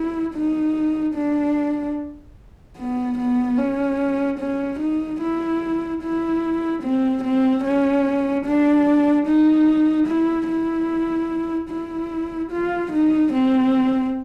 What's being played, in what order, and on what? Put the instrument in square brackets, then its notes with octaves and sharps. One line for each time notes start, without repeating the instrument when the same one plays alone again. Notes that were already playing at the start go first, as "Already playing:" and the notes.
Already playing: [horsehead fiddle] E4
D#4
D4
B3
B3
C#4
C#4
D#4
E4
E4
C4
C4
C#4
D4
D#4
E4
E4
E4
F4
D#4
C4